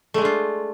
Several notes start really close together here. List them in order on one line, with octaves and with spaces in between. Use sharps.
A3 G#3 D4 F4